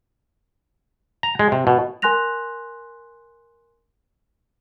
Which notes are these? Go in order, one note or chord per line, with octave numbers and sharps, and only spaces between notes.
A#5
G#3
C3
B2
A#4 G#5 C6 F#6 A#6 F7